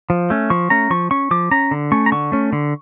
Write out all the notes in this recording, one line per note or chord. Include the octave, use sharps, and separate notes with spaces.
F3
A3 C#4
F3 C#6
A3 C#4 A#5
F3 C#6
C#4 C#6
F3 D6
C#4 A#5
D3
A3 C#4 C#6
A#5
D3 C#6
A3 C#4
D3